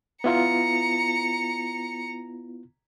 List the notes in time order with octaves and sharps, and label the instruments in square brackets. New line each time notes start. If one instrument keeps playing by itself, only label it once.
[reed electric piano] B3 E4 F4 [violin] A#5 C#7